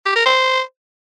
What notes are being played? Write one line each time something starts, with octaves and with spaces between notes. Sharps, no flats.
G4
A#4
C5